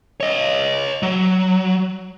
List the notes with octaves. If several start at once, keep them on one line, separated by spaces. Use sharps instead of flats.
C#5 D#5
F#3